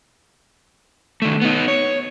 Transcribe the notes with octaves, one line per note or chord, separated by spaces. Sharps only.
D#3 A3
B3 D#4
C#5